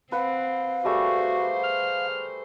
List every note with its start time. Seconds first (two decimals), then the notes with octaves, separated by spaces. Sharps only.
0.12 C4 B4 F5 F#5
0.85 G3 A3 F#4 G#4 C5
1.64 F6